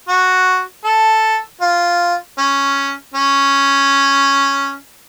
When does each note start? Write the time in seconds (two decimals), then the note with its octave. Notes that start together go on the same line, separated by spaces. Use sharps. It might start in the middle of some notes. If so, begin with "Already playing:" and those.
0.08 F#4
0.84 A4
1.61 F4
2.38 C#4
3.14 C#4